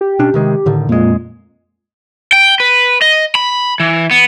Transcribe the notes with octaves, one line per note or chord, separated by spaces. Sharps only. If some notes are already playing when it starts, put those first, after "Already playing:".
G4
B2 C#4 D4
C3 D#3 G#3
A2 D3 D#3
F2 A#2 G#3
G5
B4
D#5
B5
E3
B3